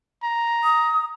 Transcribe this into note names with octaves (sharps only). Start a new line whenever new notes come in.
A#5
D#6